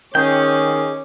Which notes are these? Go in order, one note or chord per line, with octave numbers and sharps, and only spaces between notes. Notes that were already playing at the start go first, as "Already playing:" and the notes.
D#3 C#4 G#4 G5 D6